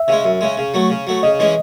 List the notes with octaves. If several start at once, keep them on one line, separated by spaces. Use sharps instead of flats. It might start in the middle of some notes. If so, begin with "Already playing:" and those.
Already playing: E5
C#3 G#3
F#2
C#3 G#3
C#3
F#3 A3
C#3
F#3 A3
C#3 D#5
E3 G#3 C#4